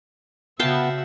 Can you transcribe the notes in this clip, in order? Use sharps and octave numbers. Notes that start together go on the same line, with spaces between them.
C#3 B3 F#4 E5 F5 G5 A5